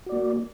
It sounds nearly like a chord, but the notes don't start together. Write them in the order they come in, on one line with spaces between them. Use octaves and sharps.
F#4 D5 A#3